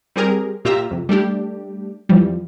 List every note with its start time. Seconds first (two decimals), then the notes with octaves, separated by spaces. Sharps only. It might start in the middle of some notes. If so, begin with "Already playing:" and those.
0.16 G3 C4 G4 G#4 A#4
0.65 A#2 F4 G4 E5 A#5
0.91 F2 C3
1.09 G3 A3 D4 G4
2.09 F2 E3 F3 G3